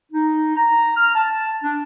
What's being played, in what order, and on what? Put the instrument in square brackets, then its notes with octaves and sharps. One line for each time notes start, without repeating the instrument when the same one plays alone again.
[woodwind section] D#4
A#5
F6
A5
D4